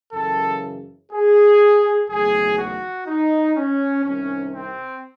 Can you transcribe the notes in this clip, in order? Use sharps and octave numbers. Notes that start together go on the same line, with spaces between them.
F#2 C#3 E3 A4
G#4
F#1 E2 D#3 F#3 A3 G#4
F#4
D#4
C#4
C2 C3 D#3 C#4
C4